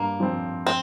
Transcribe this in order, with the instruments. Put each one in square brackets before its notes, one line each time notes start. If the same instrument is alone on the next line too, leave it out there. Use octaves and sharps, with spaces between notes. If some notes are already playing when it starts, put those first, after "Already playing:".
Already playing: [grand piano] G2 [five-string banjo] A#3
[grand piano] F3 C4
[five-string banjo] C4